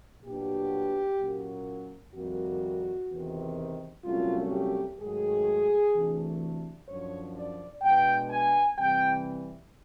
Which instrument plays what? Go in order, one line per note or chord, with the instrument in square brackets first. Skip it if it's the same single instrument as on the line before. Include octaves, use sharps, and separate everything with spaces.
[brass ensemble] A#2 F#3 B3 D4 G4
A#2 F#3 A#3 C#4
F2 C3 D#3 G3 A#3 F#4
E2 C3 D#3
C2 A#2 F#3 A3 C#4 F4
G4
G#2 D#3 F#3 A3 G#4
D2 C3 E3 A3 D4
F#2 D3 F3 C#5
D5
B2 G#3 B3 D4 G5
G#5
C3 E3 G3 G5